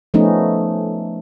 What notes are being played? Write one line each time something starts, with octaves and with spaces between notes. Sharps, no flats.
F3 A3 B3 C#4 D#4